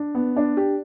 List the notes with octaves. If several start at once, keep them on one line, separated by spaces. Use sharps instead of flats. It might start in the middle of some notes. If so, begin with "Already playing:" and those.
Already playing: D4
B3
D4
G4